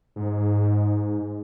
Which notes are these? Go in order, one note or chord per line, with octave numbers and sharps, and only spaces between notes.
G#2